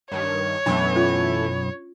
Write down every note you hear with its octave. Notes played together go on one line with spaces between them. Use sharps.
G2 D#3 C#5
B1 F#2 E3 A3 B3 D4
C#4 F4